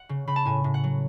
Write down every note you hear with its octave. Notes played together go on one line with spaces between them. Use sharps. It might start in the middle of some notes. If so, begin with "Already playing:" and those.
Already playing: F#5
C#3
C#3 B5
A5
A2 G#5
A2
F#5
F#3